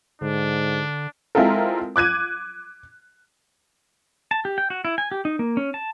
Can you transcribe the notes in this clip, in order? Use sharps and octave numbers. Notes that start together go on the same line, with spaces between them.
G#2 D3 D4
G#3 C4 E4 F4 A4 A#4
D6 F#6 G#6 D#7
A5
G4
G5
F#4
E4
G#5
G4
D#4
A#3
C#4
A5